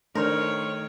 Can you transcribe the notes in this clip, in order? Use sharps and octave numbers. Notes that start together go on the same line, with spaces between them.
D#3 A3 D4 A#4 C5 C#5 F6